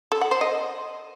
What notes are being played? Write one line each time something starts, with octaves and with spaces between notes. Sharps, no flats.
A4
F#5
C5
D#5